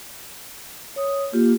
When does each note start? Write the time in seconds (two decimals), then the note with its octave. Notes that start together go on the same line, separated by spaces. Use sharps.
0.96 C#5 D#6
1.33 A#3 F4 G4